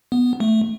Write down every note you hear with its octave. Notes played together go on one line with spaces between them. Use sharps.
B3
A3